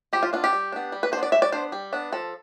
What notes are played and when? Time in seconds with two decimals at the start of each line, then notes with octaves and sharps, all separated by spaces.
0.13 F3 G4
0.23 F4
0.33 B3 D4 F4
0.44 G4
0.53 G3
0.72 B3 D4
0.92 G3
1.03 B4
1.12 D4 C5
1.17 B3
1.23 D5
1.32 G3 E5
1.42 D5
1.52 B3 D4 C5
1.72 G3
1.93 B3 D4
2.12 F3 A4